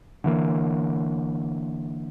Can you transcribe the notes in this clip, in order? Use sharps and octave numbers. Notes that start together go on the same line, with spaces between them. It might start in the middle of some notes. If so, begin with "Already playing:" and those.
D3 E3 A#3